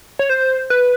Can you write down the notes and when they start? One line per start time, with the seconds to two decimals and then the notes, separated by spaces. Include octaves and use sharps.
0.19 C#5
0.30 C5
0.70 B4